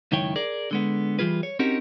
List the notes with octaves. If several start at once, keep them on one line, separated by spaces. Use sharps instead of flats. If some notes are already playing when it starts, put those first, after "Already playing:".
C#2 F#2 D#3 E4 C#5 G5
G#4 A#4 D5
D3 G#3 B3
E3 G3 F4 G#4 B4
C#5
C4 C#4 D#4 F#4 G4 A#4